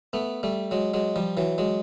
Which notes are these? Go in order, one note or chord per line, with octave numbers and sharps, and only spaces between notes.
A3 B3
G3 A3
F#3 G#3
F#3 G#3
F3 G3
E3 F#3
F#3 G#3